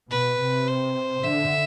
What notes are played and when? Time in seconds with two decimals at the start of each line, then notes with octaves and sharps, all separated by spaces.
0.11 B2 B4
0.39 C3
0.68 C5
1.24 D3 E5